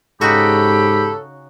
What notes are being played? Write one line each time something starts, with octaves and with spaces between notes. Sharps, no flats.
G#2 C#3 D#4 F#4 G4 A4 B5